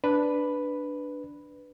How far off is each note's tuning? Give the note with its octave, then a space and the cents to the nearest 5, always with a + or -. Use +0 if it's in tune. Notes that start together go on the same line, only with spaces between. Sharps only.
D4 +0 B4 +0